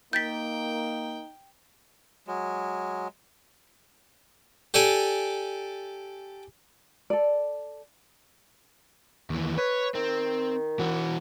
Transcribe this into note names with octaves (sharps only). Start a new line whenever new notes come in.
A#3 D#4 G5 G6 A6 B6
F#3 G#3
G4 A4 D5 G#5
A4 D5
D#2 E3
B4 C#5
D#3 C4
E3 F#4